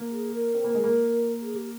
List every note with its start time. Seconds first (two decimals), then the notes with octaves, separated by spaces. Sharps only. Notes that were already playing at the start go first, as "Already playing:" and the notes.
Already playing: A#3
0.10 G#4
0.33 A#4
0.55 C4
0.64 A#3
0.74 G#3
0.84 A#3
1.41 G#4
1.55 G4